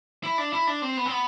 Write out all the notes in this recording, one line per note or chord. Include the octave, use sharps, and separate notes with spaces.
E4
D4
E4
D4
C4
B3
C4
B3